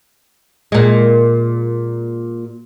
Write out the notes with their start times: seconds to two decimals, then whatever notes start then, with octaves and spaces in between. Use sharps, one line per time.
0.72 A#2 G#3